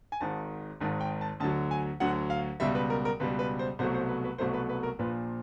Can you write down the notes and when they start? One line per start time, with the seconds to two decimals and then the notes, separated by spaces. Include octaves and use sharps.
0.12 G#5
0.21 G#1 G#2 D#3 A5
0.80 G#1 G#2 D#3 A5
1.01 G5
1.21 A5
1.40 D2 D3 F#3 A5
1.71 G#5
2.00 D2 D3 F#3 F#5
2.30 F5
2.60 C#2 B2 G3 E5
2.75 B4
2.90 A#4
3.05 A#4
3.20 C#2 B2 G3 B4
3.39 B4
3.59 C5
3.79 C2 B2 F#3 A3 C5
3.94 C5
4.09 B4
4.25 B4
4.38 C2 B2 F#3 A3 C5
4.54 B4
4.69 B4
4.83 A#4
4.99 A#1 A#2 F3 B4